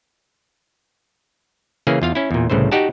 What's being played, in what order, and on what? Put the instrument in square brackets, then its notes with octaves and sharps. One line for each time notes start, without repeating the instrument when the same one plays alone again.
[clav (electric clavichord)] C#3 E3 A#3 C#4 G#4
E2 F4 F5
C#4 E4
E2 A#2
C2 A2 C#3 E3 C5
D#4 F#4 G4 D5 F#5 A5